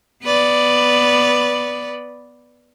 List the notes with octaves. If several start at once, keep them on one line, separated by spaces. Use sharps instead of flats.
B3 B4 D5